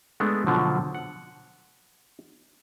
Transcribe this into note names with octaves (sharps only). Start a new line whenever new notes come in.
G#3 A3 B3 D4
B2 D3 F3 F#3
F#5